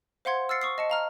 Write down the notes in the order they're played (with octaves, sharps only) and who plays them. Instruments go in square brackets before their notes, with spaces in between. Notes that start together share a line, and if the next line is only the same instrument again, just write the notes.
[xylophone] C5 F5 F#5 C6 G#6
E6 F6 A6 C7 C#7
C#6 D#6 C7
D#5 A5 C#7
F5 A#5 F6